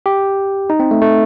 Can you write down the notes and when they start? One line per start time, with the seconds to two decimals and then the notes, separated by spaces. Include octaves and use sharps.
0.06 G4
0.70 D#4
0.80 C4
0.91 A3
1.02 A3